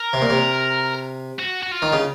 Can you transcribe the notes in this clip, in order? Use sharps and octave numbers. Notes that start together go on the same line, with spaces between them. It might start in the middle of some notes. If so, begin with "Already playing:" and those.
Already playing: A#4
C3
A#2
C3
F#4
F#4
F4
D#3
C#3